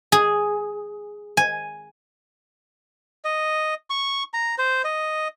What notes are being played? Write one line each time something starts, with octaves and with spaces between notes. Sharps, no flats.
G#4
G#5
D#5
C#6
A#5
C5
D#5